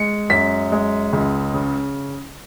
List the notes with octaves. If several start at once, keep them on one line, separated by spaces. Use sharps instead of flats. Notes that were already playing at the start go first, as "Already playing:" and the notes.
Already playing: G#3 C#7
F#2 B6
G#3
C#2
C#3